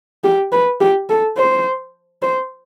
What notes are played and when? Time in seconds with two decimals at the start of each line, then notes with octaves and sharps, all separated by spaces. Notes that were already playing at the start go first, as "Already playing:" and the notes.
0.24 G4
0.52 B4
0.81 G4
1.10 A4
1.37 C5
2.22 C5